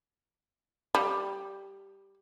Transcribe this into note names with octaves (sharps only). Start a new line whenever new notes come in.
G3